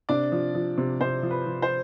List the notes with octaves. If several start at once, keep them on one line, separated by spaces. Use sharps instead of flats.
C3 D4 D5
F3
F3
C3
C3 C5
F3
B4
F3
C5